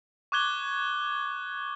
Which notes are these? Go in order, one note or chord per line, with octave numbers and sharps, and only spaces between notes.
C#6 D6 F#6 G#6 G7